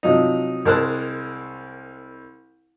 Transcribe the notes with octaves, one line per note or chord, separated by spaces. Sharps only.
C3 F3 F#3 D#4
C2 G#3 A#4 C5 A5 F#6